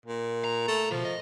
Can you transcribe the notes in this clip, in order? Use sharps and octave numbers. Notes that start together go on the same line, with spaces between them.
A#2
A#5
A3
B1 B2 F3
D#5